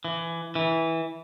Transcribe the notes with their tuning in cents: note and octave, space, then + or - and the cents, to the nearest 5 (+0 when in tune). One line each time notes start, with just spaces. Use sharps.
E3 +20
E3 -10